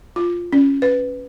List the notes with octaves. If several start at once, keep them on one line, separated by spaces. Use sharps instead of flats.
F4
C#4
B4